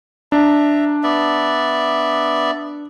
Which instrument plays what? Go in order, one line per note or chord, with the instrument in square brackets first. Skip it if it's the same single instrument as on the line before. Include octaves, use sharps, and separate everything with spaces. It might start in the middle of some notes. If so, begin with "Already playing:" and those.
[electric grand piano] D4 [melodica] E5 A#5
[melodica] B3 D5 E5